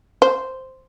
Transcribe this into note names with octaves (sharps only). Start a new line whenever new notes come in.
C5